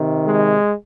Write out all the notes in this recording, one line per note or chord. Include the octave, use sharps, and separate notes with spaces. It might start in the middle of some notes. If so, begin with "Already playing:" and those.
Already playing: C3 D#3
G#3